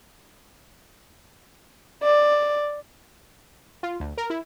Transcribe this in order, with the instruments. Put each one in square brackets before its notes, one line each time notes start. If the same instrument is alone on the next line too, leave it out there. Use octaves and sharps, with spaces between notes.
[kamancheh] D5
[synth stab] F4
D2
A#4
E4